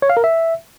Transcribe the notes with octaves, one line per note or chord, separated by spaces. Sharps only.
C#5
F5
A#4
E5